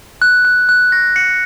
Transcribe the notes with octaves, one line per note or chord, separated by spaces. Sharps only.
F#6
F#6
F#6
A#6
C#7